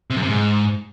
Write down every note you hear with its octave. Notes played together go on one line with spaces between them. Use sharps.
C3
F#2
C3
G#2